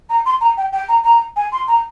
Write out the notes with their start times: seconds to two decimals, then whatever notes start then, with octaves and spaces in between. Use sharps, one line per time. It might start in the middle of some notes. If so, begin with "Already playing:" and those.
0.10 A#5
0.26 C6
0.41 A#5
0.57 G5
0.73 G5
0.89 A#5
1.04 A#5
1.36 G#5
1.52 C6
1.68 A#5